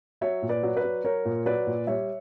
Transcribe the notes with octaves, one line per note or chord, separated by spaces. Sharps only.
F#3 C#5 E5
A#2
B4 D5
F#3
B4 D5
F#3
F#3 A#4 C#5
A#2
F#3 B4 D5
A#2
G3 C#5 E5